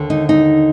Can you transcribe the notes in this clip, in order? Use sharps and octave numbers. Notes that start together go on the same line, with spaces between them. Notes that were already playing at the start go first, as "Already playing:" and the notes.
Already playing: D#2 D3
D#4
D#4